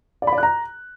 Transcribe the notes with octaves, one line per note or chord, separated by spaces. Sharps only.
D5
B5
D5
F#6
A#5